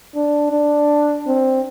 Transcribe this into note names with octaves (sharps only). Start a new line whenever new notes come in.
D4
D4
C4